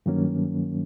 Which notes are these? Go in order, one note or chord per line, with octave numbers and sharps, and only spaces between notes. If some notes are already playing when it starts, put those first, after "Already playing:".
G2 D#3 F#3 A#3 C#4